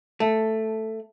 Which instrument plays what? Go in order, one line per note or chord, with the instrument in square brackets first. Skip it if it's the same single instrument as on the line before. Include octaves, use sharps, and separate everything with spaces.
[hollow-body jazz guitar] A3